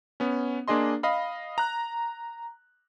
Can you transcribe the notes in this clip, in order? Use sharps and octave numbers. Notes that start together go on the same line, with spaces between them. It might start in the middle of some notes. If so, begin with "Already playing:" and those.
B3 C#4
A#3 D4 G#4 D#5 C6
D#5 F5 B5
A#5 F#6